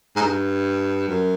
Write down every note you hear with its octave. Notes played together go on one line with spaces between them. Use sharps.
G#2
G2
F#2